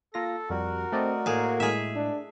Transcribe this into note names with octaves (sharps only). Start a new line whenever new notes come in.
A#3 F4 A4 A#6
F2 G3 F#4 A#4
A3 C4 D5 D#5
A2 A#3 G#4
A2 G#3 G#4 E5
D4